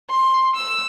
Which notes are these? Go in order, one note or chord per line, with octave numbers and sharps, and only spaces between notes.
C6
E6